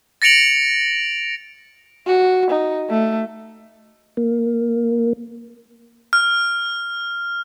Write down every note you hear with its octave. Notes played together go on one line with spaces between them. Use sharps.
A6 A#6 C#7 D7 F7 F#7
F#4
D#4
A3
A#3
F6